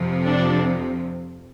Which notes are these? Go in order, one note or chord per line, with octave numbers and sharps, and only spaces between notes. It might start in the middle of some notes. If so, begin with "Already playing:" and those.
Already playing: F2 C3 F3
D4